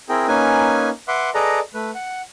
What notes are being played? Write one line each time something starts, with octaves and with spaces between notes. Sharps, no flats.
C4 E4 G#4 A#4 G5
A#3 C#4 D#4 B4 G#5
B4 E5 F#5 C6 D6
G#4 A4 B4 D5 D#5 A#5
A3 B4
F#5